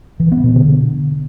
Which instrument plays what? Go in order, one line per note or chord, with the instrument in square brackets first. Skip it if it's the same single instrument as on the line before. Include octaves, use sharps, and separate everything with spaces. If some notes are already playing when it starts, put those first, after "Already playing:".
[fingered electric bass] E3
B3
B2
D3